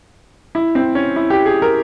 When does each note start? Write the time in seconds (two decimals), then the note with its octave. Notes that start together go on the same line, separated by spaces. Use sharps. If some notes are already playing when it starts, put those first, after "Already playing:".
0.55 E4
0.75 C4
0.95 C#4
1.16 E4
1.30 G4
1.46 G#4
1.62 A#4